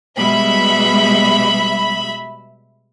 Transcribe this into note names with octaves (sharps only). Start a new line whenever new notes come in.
B2 G3 G#3 E5 B5